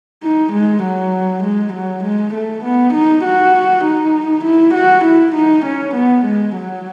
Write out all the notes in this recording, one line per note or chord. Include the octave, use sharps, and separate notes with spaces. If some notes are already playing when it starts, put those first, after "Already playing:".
D#4
G#3
F#3
G#3
F#3
G#3
A3
B3
D#4
F#4
D#4
E4
F#4
E4
D#4
C#4
B3
G#3
F#3